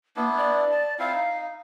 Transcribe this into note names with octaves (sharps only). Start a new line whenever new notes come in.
A#3 B3 D4 E4
D5
A5
C4 E4 F4 F5
D#4